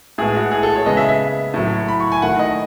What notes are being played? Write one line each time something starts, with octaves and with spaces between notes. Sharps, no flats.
A2 G#3 B3 G#4
F#4
G#4
A4
C#5
C#3 G#3 B3 D#5
E5
E5
A2 F#3 A3
B5
C#6
G#5
D#3 A3 F#5
D#5